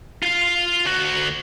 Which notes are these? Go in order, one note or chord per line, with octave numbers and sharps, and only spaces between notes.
F4 F5
D2 F#4